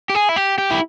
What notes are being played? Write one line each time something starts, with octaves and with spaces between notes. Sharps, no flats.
G4
G#4
E4
G4
G4
E4